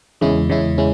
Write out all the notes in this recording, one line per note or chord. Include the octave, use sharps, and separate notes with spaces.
E2 C#3 G#3 C#4 E4
E2 C#3 G#3 C#4 E4
G#3 C#4 E4